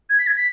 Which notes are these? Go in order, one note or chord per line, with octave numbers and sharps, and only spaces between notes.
G#6
B6
G#6
B6